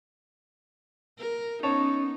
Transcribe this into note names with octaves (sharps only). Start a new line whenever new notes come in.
A#4
B3 C#4 D#4 C#5 A5